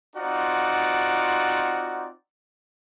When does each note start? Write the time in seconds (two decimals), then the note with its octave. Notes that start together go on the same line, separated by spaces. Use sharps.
0.15 C4 D#4 F4 F#4 D5 F#5